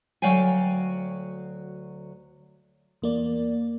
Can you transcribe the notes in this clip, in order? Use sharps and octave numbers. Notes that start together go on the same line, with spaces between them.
D2 F#3 D5 F5 G5 G#5
E2 A#3 D5